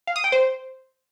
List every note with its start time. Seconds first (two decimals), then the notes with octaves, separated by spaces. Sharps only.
0.07 F5
0.16 D#6
0.24 G5
0.32 C5